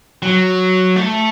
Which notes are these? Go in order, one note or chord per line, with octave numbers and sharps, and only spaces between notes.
F#3
A3